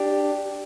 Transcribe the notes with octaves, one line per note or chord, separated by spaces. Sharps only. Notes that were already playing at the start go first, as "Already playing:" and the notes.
Already playing: D4 G4